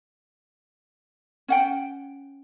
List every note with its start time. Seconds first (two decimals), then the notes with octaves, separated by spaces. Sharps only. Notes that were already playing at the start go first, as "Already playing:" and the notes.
1.48 C#4 F#5 G5